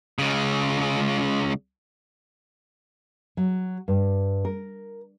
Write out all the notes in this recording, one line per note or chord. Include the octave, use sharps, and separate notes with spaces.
C#2 C#3
F#3
G2
A#4